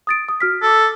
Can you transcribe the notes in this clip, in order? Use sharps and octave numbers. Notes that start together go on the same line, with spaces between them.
D#6 A6 D7
D#6
F#4 F6 B6
A4 D6 E6